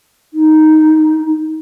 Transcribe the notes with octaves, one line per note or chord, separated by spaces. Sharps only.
D#4